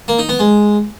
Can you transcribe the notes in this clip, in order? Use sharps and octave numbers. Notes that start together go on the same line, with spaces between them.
A#3
D#4
B3
G#3